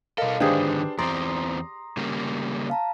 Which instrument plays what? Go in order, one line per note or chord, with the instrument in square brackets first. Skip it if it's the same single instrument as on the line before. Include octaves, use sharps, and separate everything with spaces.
[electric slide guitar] B2 A4 [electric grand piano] A#4 [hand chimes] D#5 F5
[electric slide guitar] G#2 D3 D#3 [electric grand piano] D4 C5 [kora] G4 G#4 [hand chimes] B4
[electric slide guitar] E2 C4 [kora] D5 [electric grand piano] A#5 C6 [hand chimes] D#6
[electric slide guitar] C#3 G3 A#3
[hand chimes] F5 A5 A#5